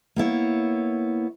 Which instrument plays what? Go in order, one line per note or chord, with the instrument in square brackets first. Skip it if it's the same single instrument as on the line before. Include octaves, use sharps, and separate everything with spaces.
[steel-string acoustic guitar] A#3 B3 E4 C#5